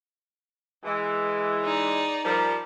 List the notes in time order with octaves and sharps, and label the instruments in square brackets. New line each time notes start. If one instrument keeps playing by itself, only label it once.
[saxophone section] E3 [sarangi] G#3
[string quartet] D#4 D5
[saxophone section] F3 G3 [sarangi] A#4